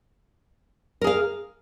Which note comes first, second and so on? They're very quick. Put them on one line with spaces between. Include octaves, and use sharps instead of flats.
A#4 G#4 F5